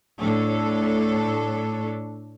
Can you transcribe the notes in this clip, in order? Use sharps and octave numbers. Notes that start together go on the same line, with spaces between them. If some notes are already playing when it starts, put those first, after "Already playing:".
A2 A3 D4 A4 C#5